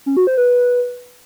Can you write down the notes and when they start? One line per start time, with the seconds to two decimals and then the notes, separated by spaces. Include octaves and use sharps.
0.06 C#4
0.17 F#4
0.27 C5
0.37 B4